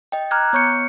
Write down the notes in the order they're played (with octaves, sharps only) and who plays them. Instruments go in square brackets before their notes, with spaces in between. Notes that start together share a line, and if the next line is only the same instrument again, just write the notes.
[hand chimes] D#5 G5
A#5 D6 F6 F#6 G#6
B3 C#5 C#6 G6 C#7